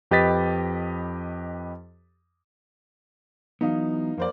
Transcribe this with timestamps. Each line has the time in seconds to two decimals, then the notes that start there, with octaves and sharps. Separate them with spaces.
0.11 F2 G4 B4 D#5 A6 B6
3.61 E3 F#3 B3 D#4 F5
4.17 F2 A#3 C5 D5